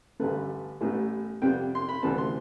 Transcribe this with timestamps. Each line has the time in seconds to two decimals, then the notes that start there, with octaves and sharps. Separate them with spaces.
0.20 A1 G2 D3 A3 B4
0.81 A1 A2 G3 B3
1.42 F2 C3 G3 B3 G5
1.75 C6
1.89 B5
2.03 D2 C3 E3 G3 B3 A5
2.18 C6